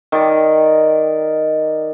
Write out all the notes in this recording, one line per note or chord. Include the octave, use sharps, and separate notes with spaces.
D#3 D5